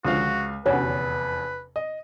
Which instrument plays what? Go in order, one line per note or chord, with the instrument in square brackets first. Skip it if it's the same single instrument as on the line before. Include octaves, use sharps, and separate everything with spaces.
[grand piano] C#2 F5 [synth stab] D3 F3 [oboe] F#4
[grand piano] F1 E2 [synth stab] D3 C#4 F#4 [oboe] B4
[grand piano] D#5